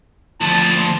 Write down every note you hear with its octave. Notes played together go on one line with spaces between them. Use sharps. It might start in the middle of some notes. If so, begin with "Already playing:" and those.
D2 F3 A5